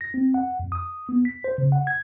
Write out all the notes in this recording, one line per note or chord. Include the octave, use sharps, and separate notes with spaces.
A#6
C4
F#5
F2
D#6
B3
B6
C5
C#3
F#5
G#6